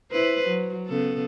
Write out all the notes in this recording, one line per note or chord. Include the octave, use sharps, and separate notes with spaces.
E4 B4 C5
F#3
C#3 B3 A4